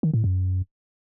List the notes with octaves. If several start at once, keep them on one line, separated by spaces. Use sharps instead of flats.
D#3
A2
F#2